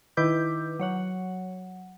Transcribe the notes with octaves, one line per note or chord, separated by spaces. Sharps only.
D#3 E4 B4 D6 G6
F#3 C#5 F#5